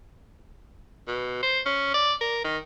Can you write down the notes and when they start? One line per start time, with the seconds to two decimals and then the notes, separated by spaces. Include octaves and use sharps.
1.08 B2
1.43 C5
1.66 C#4
1.94 D5
2.21 A#4
2.45 D#3